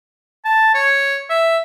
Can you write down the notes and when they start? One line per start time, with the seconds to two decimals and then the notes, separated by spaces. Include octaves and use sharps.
0.45 A5
0.75 C#5
1.30 E5